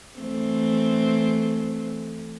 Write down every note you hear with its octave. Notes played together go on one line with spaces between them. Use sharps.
E3 A3 C4